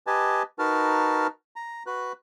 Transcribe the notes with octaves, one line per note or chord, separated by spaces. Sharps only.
G4 B4 D#5 G#5 A5
D#4 F#4 A#4 B4 A5 F6
A#5
F#4 B4 F#6